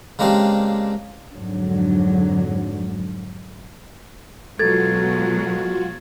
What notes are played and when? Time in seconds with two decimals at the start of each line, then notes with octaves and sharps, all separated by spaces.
0.19 C#3 G#3 A#3 C4 D4 G4
1.33 F2 G#2 D3 F#3
4.59 B2 F#3 G#3 F4 F#4 A4 G#6 A6